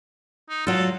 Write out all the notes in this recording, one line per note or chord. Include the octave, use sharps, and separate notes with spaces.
D#4
F#3 F4 A4